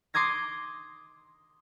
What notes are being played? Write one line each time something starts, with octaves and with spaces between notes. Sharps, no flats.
C6 D6 D#6 G#6 A#6